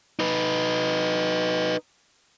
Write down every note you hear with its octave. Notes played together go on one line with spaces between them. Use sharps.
D#4 B4